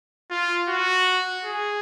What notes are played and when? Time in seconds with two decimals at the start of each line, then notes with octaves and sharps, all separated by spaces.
0.31 F4
0.69 F#4
1.45 G#4